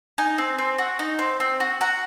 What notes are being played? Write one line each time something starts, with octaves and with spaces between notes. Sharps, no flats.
D#4 G#5
C4
C4
F#4
D#4
C4
C4
F#4
F#4 A#5